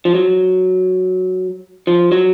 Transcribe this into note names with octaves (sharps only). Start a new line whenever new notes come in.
F3
F#3
F3
F#3